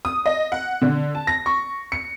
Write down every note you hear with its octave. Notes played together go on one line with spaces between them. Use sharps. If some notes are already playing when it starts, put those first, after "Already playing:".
D#6
D#5
F#5
D3
A5
A#6
C#6
C#7